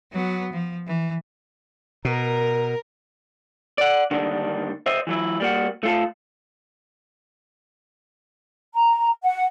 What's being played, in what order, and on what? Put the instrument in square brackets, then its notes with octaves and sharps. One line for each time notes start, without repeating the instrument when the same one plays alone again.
[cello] F#3 B3
F3
E3
[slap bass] B2 [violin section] A#4
[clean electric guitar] D5 F#5
D3 D#3 G3 A#3 D4
C5 D#5 E5
E3 F#3 E4
G3 A#3 F#4
A3 F4 A4
[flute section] A#5
F#5